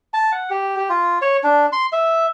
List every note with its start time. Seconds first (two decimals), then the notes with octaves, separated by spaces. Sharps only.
0.14 A5
0.32 F#5
0.50 G4
0.77 G4
0.89 F4
1.22 C#5
1.44 D4
1.72 C6
1.92 E5